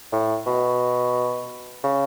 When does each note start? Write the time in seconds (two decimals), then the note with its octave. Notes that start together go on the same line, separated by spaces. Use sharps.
0.13 A2
0.46 B2
1.84 C#3